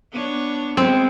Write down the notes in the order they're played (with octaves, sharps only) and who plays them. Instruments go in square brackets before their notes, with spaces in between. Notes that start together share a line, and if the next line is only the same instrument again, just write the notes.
[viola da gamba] B3 D4 C#5
[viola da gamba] G#3 B3 [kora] C4